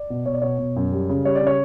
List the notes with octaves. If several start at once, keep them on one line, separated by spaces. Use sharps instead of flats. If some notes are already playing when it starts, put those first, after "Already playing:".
Already playing: D5
B2
B2 C#5
D5
B2 C#5
B2
F#2
G3
C#3
G3 C#5
D5
C#3
C#5